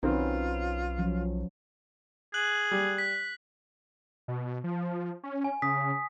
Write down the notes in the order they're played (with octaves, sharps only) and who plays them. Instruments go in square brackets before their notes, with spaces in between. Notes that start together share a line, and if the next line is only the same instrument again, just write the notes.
[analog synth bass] B1 [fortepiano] D#3 C4 C5 [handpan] C#4 F#4 B4 [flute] F4
[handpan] F3 F#3 C#4
[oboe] G#4 [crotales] F#6 F#7
[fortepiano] G3 G4
[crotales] B6
[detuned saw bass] B2
F3
C#4
[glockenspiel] G#5
[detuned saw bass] C#3 [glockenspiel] D#6 B6